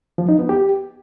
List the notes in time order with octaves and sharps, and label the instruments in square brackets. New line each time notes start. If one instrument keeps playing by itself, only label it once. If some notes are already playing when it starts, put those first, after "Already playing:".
[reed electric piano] F3
D#4
B3
G4